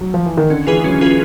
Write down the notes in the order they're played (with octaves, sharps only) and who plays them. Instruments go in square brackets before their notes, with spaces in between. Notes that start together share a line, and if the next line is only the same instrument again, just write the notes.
[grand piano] F#3
F3
E3
D#3
[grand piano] D3 [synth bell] C#4
[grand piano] E3 [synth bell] F4 G#4 B4
[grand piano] F#3 [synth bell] C#4
[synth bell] F4 G#4 B4